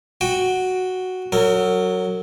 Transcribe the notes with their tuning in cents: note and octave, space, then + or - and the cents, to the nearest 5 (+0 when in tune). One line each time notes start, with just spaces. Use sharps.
F#4 +0 G5 +15
F#3 +0 A#4 -35